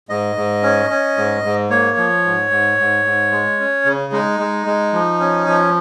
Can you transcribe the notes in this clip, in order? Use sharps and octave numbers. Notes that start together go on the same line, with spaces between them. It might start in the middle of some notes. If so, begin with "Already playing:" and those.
G#2 D#5
G#2
C#4
C#4
G#2
G#2
A#3 C#5
F3
G#2
G#2
G#2
G#2
G#3
C#4
C#3
G#3 D#4
G#3
G#3
F3
C#4
F3